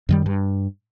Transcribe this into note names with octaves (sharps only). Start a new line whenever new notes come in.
F#2 D#3 G3
G2